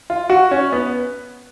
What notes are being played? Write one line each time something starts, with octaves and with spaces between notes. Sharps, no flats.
F4
F#4
C#4
B3